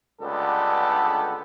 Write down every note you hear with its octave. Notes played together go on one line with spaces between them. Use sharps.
C#2 G2 D3 B3 G4 A4